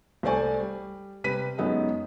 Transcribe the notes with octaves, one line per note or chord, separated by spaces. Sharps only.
C2 A3 C5 D5 G#5 C#6
G3
C3 G3 B4 B6 D#7
F#2 G#3 B3 D#4